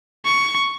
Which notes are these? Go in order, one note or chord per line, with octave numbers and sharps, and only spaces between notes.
C#6